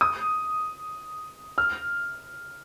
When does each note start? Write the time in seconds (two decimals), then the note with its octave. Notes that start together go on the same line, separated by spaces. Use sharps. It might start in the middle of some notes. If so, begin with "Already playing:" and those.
0.01 D#6
1.58 F6